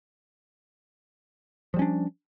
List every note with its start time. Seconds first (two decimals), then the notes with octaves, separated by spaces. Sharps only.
1.74 F3
1.76 G3
1.79 C#4
1.82 D4